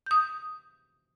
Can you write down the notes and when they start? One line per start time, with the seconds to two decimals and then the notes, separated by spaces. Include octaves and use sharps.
0.06 D#6 G6